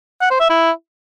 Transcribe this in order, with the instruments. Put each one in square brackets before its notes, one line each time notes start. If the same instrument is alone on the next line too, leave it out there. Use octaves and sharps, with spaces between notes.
[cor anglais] F#5
C5
E5
E4